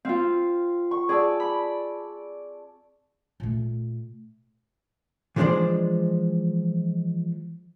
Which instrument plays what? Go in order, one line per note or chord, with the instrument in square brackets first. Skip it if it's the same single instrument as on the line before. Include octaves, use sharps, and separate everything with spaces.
[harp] C4 F4 [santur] F5
[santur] C#6
[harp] G#4 [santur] D5 A5 E6
[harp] B5
[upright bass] A#2 A3
[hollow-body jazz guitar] E3 F3 G#3 D4 C5 D5